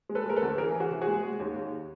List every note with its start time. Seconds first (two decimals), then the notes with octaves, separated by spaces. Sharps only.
0.09 G#3
0.15 A4 B4
0.26 G#3 A#4
0.36 A4 B4
0.42 D2
0.58 E3 G#4 A#4
0.75 E3
0.80 F#4 G#4
0.91 C3
1.01 F#4 G#4
1.07 G#3
1.23 G#3
1.40 D#2
1.56 D#2